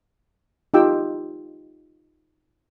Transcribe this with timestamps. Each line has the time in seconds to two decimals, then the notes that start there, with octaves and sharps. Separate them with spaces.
0.74 D#4 F4 G4 G5 E6